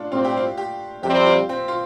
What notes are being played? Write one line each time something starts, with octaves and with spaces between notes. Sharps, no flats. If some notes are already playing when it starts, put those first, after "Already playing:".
Already playing: A3 D4 F4
A2 G3 C4 F4
G4
F4
G4
F2 C3 G3 C4 G4
F4
C4
F4